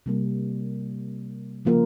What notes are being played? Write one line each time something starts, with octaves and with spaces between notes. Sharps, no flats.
C3 G3 A#3
C#3 F3 A#3 F4 A#4